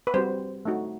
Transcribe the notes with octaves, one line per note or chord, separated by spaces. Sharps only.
B4
G3 C4 F#4 C5
A3 D#4 F#4